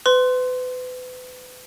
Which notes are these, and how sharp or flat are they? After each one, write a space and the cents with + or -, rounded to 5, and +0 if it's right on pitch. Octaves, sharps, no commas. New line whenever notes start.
B4 +35 C6 +0